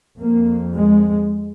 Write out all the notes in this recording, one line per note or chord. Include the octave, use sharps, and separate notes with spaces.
F2 A#3
G#3